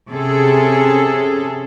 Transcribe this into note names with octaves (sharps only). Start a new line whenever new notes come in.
C3 C#4 G#4 A4